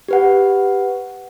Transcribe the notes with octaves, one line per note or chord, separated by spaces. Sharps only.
G4 B4 F#5